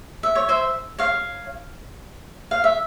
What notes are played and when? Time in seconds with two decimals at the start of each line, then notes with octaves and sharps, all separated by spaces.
0.23 E5
0.35 C#5
0.49 C5 E5
0.98 C#5 F5
2.51 F5
2.64 E5